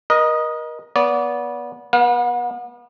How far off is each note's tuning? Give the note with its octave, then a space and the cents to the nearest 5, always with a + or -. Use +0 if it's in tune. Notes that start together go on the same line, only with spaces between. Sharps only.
A#4 +35 D#5 -5
B3 -25 D5 -30
B3 -35 F5 +40